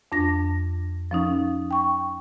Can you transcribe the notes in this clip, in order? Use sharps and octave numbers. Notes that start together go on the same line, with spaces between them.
F2 D4 A#6
F3 C#4 D#4
G5 C#6